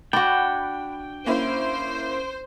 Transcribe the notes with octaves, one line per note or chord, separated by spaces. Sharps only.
D4 F#4 G5 B5
A#3 C#4 E4 C5